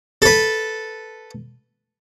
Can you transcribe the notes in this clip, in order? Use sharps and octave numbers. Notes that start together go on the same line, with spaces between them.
A4 B4